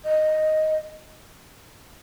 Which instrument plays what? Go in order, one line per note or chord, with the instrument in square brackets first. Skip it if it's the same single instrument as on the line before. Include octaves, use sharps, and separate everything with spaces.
[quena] D#5